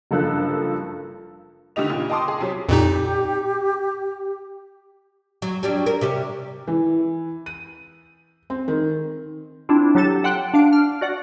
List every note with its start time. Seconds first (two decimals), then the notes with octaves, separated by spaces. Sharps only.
0.11 F#1 G2 F3 A4 A#4 F#6
1.76 D3 D#3 A3 G4 D#5 F7
1.89 A#2 C#3
2.09 D#5 G5 A5 C6 D6 D#6
2.28 G#4
2.40 C3 F#3 C#4
2.69 F2 A#2 D#4 G4
5.42 F#3
5.63 F#3 G3 D4
5.86 A#4
6.01 C3 G3 C#4
6.67 E3
7.46 D#7
8.50 C4
8.68 D#3
9.69 C4 D4 E4 F4
9.95 F#3 G4 A4 A6 E7
10.24 F#5 G5 C6 F#6
10.54 D4 F5 C7 D7
10.73 F6
11.01 F#4 D5 F#5